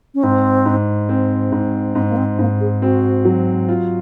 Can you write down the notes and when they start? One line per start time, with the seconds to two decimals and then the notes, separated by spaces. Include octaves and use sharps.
0.14 C#4
0.23 G#2 C4
0.66 G#2
1.09 C4
1.52 G#2
1.95 G#2 C4
2.10 A#3
2.17 C4
2.39 G#2 A#3
2.60 G#4
2.81 C4 F#4
3.25 F#3
3.69 F4